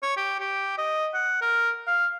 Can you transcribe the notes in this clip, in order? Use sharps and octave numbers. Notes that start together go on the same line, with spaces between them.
C#5
G4
G4
D#5
F#5
A#4
F5